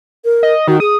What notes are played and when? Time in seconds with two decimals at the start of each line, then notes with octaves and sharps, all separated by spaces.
0.25 A#4
0.43 D#5
0.68 D#3 F#4
0.80 G#4 D#6